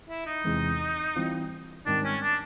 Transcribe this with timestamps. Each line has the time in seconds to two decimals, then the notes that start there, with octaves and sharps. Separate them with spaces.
0.09 E4
0.26 D#4
0.44 E2 C3 E3 G#3
1.15 E3 G3 C4 F4
1.86 G#2 D#3 G3 C4 D4
2.04 C#4
2.22 D4